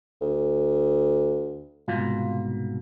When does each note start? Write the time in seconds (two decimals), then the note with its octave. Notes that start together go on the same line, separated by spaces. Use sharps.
0.21 D2
1.88 C2 G#2 B2 F4